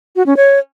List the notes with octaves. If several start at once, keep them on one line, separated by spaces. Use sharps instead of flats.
F#4
C#4
C#5